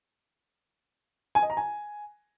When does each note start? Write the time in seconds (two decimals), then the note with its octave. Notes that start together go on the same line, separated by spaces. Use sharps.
1.35 G#5
1.42 D#5
1.50 A#5
1.57 G#5